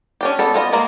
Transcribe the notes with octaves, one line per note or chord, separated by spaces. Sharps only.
C#4 D4 G4
B3 A4
B3 F4 D#5
G#3 A#3 A#5